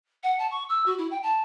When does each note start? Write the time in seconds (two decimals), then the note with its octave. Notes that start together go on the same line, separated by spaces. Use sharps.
0.23 F#5
0.39 A5
0.51 C#6
0.69 E6
0.86 F#4
0.98 E4
1.11 G5
1.23 A5